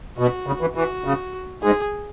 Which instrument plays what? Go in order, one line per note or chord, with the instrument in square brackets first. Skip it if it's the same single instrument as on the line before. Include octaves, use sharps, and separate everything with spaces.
[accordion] B2 [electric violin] F#4
[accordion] C#3
E3
[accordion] E3 [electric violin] F#4
[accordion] C#3
[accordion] G#2 [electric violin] G#4